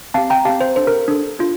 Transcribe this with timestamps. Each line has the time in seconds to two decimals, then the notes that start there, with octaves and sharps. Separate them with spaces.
0.14 C4 G4 F5 A5
0.30 G5 A#5
0.45 C4 G4 F5 A5
0.61 C5
0.76 D4 A4 C5
0.87 A#4
1.08 D4 A4
1.39 D4 F4